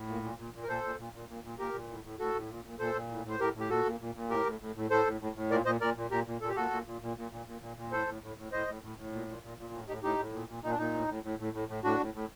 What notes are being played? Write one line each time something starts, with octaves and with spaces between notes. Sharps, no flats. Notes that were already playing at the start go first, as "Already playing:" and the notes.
Already playing: A2
A#2
A#2
A#2
A#2
A#4
A#2 A4 C5
A#2
A#2
A#2
A#2
A#2
A#2 G4 A#4
A#2
A2
A2
A2 F#4 A4
A2
A#2
A#2
A#2 A4 C5
A#2
A2
A2 C5
A2 G4 A#4
A2
G4
A#2 F#4 A4
A#2
A#2
A#2
A2 G4 A#4
A2
A2
A2
A2 A4 C5
A2
A2
A2
A#2 A#4 D5
A#2 C5 D#5
A#2 A#4 D5
A#2
A#2 G4 A#4
A#2
A#2 A4
G4
A#2 F#4 A4
A#2
A#2
A#2
A#2
A#2
A#2
A#2
A#2
A2 A4 C5
A2
A2
A2
A2 C5 D#5
A2
A2
A2
A#2
A#2
A#2
A#2
A2
A2 D#4 G4
A2 D#4 G4
A2
A#2
A#2
A#2 D#4
D4
A#2 D#4
A2
A2
A2
A2
A2
A2
A2 D4 F#4
A2
A2